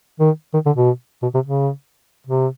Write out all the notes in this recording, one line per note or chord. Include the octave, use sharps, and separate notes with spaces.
D#3
D#3
D3
B2
B2
C3
C#3
C3